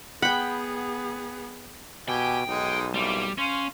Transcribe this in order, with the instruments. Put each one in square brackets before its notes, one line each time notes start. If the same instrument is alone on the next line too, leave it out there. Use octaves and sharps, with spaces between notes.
[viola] B3 G#4 [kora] F#5 [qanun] G5 B5
[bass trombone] B2 [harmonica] G4 G#5 [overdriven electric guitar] G5
[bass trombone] B1 [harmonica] G#3 D#4
[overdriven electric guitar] G3 [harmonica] A#3 C4 E4
[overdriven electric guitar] C#4 [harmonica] C5 F5